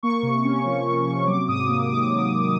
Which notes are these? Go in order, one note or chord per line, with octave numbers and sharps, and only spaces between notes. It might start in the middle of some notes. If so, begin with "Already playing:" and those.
A#3 C#6
C3
C#4
F3
A#3
C3
F#3 D6
G#2 D#6
A#3
D#3 D6
F#3
G#2